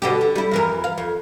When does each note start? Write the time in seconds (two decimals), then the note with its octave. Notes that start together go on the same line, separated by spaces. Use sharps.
0.02 B2 D3 G4
0.21 D3
0.36 G3 E4
0.51 F2 E3 A#4
0.84 F5
0.98 F2